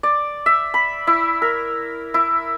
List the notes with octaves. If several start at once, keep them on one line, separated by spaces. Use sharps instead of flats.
D5
E5
B5
E4
A#4
E4